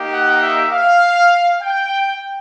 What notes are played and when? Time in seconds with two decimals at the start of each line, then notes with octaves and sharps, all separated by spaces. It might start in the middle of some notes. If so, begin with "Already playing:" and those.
Already playing: A#3 D#4 G4
0.12 F#5
0.42 E5
0.72 F5
1.61 G5